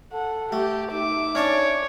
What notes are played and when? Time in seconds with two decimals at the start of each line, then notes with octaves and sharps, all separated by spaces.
0.12 A4 F#5
0.52 A3 G4
0.92 D#4 E5 D6
1.35 C#4 D4 C#5 A5